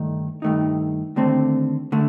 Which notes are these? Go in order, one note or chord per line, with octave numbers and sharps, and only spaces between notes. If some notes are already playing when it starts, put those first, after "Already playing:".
Already playing: G2 D#3 A3 D#4
G2 D#3 A3 D#4
D#2 D3 A3 C4
D3 A3